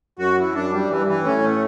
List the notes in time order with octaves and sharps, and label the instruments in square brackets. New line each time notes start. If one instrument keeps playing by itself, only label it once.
[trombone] F#2 [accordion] F#4
[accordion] E3
[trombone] F#2 [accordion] D4
[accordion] G3
[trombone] G2 [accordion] E3
[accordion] E3
[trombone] A2 [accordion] C#4
[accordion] A3